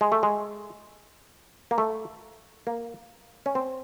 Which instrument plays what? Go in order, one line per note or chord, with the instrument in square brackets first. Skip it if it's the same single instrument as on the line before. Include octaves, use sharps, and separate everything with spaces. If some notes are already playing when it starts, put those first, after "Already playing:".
[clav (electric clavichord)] G#3
A3
G#3
A#3
A3
A#3
C#4
C4